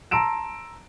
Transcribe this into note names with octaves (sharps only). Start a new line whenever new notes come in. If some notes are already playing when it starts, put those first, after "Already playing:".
A5 A#5 C6 E6 D7 E7